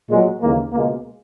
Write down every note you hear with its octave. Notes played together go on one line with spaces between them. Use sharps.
A#2 F#3 G#3
D#2 C#3 E3 G#3 A#3
C#2 B2 G#3 A#3